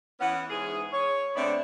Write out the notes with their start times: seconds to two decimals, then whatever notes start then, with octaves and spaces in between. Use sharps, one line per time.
0.19 E3 B3 C#4 F#5
0.50 G#2 E3 G#4
0.92 C#5
1.36 D3 A3 B3 C4 D4